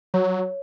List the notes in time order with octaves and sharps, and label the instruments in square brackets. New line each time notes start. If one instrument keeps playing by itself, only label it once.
[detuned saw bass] F#3 [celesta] C#5